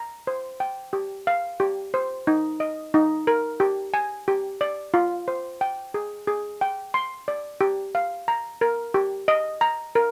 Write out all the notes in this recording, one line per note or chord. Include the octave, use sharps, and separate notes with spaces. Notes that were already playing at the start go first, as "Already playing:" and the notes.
Already playing: A#5
C5
G5
G4
F5
G4
C5
D#4
D#5
D#4
A#4
G4
G#5
G4
D5
F4
C5
G5
G#4
G#4
G5
C6
D5
G4
F5
A#5
A#4
G4
D#5
A#5
A#4